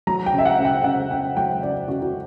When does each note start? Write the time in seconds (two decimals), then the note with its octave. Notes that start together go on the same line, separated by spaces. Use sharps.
0.07 F#3 A#5
0.26 G5
0.33 C#3
0.38 E5
0.45 F#5
0.58 C#3
0.65 G5
0.84 C#3 F#5
1.11 C#4 G5
1.37 F#3 G5
1.63 C#3 D5
1.88 C#3 F#4
2.02 F#4